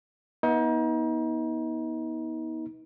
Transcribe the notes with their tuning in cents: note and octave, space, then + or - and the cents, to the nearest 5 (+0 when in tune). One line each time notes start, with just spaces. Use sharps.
B3 -30 D#4 +35